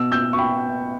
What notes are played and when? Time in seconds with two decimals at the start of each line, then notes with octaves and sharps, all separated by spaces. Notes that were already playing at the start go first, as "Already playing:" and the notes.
Already playing: B2 E6
0.12 E6 G6
0.33 C#6
0.38 G5 B5